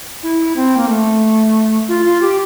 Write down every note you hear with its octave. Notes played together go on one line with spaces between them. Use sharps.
E4
C4
A#3
A3
F4
F4
G4